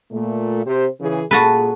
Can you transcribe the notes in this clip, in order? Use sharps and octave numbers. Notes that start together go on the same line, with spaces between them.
A#2 A3
C3 G4 C5
C#3 E3 G#4
A#2 F#4 G#4 A4 B4